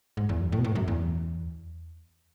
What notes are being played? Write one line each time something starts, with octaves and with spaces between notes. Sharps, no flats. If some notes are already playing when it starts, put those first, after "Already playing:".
G#2
E2
F#2
A2
B2
A2
G#2
F#2
E2